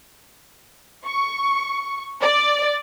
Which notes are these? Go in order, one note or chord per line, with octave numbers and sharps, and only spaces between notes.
C#6
D5